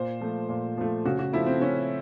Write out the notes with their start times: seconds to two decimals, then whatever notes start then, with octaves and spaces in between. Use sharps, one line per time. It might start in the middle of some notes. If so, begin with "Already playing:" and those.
Already playing: A#2 C5
0.21 F3 A3
0.49 A#2
0.77 F3 A3
1.05 C#3 F#4
1.19 F#4
1.33 F3 A3 E4
1.46 C4
1.60 C#3 C#4